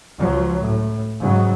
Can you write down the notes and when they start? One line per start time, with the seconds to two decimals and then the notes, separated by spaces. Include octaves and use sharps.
0.19 C#2 F3 F#3
0.64 A2
1.21 G#2 C#3 F#3